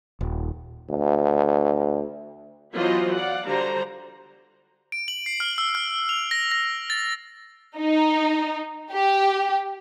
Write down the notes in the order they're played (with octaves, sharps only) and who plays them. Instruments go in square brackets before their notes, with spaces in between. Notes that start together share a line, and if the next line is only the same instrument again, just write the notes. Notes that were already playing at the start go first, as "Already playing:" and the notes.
[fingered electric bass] D#1
[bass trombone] D2
[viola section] E3 F#3 B3 F4 C5 D#5
D5 F5 F#5
D3 G3 F#4 C5 A#5
[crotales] D7
F#7
C7
F6
E6
F6
F7
A#6
A#6
A6
[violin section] D#4
G4